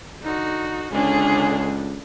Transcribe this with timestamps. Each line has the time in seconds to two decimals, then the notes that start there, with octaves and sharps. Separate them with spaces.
0.22 D3 D#4 F#4
0.92 C#2 D3 C#4 D4 G#4